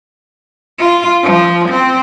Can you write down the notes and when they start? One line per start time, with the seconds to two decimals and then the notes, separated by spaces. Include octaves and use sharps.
0.79 F4
1.24 F3
1.69 C4